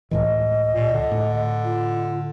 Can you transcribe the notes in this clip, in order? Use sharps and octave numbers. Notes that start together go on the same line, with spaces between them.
C#2 A2 E3 D#5
A#2
D3
A2
F4